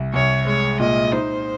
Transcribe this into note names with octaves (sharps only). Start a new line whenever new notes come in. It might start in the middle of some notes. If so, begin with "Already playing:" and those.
Already playing: C2
C2 C#5
G#3 C#5
A#2 D#5
D#4 C5